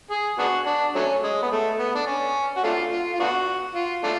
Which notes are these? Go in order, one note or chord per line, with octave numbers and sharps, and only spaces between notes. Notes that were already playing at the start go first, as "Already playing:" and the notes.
G#4
B3 D4 F#4
D4
F#3 A3 C#4
G#3
B3
A3
B3
D4
C#4
F#4
A3 D4 F4
F4
F4
B3 D4 F#4
F4
A3 D4 F4